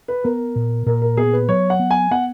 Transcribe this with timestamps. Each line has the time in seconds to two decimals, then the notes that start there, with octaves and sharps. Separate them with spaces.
0.08 B4
0.24 B3 A#4
0.56 A#2
0.86 A#2 A#4
1.02 A#4
1.17 B3 G#4
1.33 B4
1.48 F#3 C#5
1.70 F#5
1.79 B3
1.91 G#5
2.11 B3 F#5